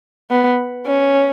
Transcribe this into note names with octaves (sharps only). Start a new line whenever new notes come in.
B3
C#4